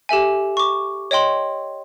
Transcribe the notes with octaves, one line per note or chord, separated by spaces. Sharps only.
G4 A4 E5 G#5
C#6 D6
C#5 D#5 G5 C6 F#7